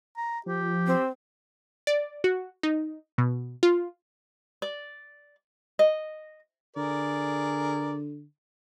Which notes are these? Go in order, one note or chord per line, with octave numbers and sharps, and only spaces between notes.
A#5
F3 G4
C4
D5
F#4
D#4
B2
F4
D5
D#5
D3 G#4 A#4 D5